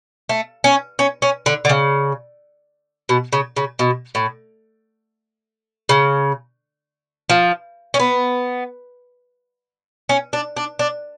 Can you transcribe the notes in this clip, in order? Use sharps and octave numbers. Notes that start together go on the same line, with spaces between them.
A3
C#4
C#4
C#4
D3
D3
C#3
B2
C#3
C#3
B2
A2
C#3
F3
C#4
B3
C#4
D4
D4
D4